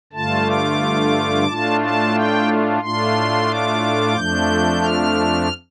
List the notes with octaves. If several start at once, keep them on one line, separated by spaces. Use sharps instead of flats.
G2 D3 A3 F4 A5
D6
A2 A3 D4 F4 A5
A5
G5
A2 A3 D4 F4 C6
D6
F2 F3 A3 D4 G6
F6